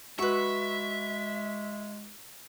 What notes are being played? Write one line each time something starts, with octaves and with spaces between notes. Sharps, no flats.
G#3 F#4 B4 E5 C#6